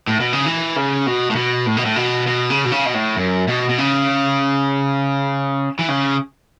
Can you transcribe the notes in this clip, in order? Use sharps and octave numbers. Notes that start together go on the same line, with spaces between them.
A2
B2
C#3
E3
C#3
B2
A2
B2
A2
B2
A2
B2
B2
C#3
B2
C#3
B2
A2
F#2
B2
B2
C#3
E3
C#3